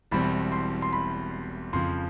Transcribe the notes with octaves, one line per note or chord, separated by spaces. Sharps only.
E1 E2 B2 G3 C4 B5
C6
C6
B5
F2 C#3 F3 C6